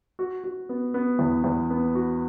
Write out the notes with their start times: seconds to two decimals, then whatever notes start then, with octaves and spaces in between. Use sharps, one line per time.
0.19 F#4
0.44 F#4
0.69 B3
0.94 B3
1.19 E2
1.44 E2
1.70 B3
1.95 F#4